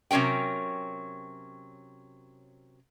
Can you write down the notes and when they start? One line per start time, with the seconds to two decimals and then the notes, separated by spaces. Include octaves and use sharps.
0.11 C3 F#3 C#4 A#4 G5